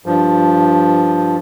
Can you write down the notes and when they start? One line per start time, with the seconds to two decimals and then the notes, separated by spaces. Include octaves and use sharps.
0.06 G2 F3